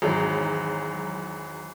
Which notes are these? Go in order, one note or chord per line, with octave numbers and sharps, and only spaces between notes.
G#1 E2 G#2 E3 F#3